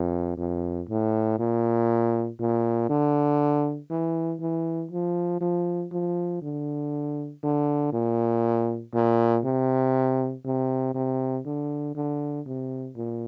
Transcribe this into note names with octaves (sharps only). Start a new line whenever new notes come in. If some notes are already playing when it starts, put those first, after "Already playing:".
Already playing: F2
F2
A2
A#2
A#2
D3
E3
E3
F3
F3
F3
D3
D3
A#2
A#2
C3
C3
C3
D3
D3
C3
A#2